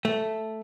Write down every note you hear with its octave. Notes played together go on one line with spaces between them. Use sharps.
A3